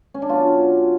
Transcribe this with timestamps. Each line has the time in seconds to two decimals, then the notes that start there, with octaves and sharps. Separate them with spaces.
0.14 C#4
0.22 D4
0.29 B2 F#3 C#4 F4